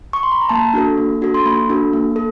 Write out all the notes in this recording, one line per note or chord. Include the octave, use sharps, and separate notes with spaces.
C#6
C6
B5
A#5
A#3 A5
D4 F#4 A4
A#3
D4 F#4 A4
C6
A#3 B5
D4 F#4 A4
A#3
A4